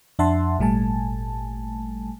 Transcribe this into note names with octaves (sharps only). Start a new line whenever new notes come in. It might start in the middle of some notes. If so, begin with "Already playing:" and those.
F2 D4 E5 F#5 A5 C6
G#1 A#2 G3 A3 G#5 A5